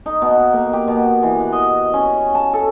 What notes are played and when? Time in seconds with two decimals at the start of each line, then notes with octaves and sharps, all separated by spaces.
0.06 D#4
0.22 B2
0.53 A#3
0.73 G4
0.87 B2
1.23 E3
1.40 F#5
1.52 D#5
1.93 C#4
2.35 A5
2.53 A4